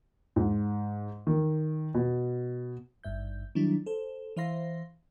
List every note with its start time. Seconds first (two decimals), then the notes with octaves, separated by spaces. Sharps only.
0.36 G#2
1.27 D#3
1.94 B2
3.04 G#1 G2 E5 G6
3.55 D#3 F#3 G3 D4 E4
3.86 A4 C5
4.37 E3 C5 E5 F5 C6 A#6